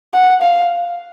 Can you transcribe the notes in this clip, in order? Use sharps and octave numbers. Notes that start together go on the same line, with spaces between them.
F#5
F5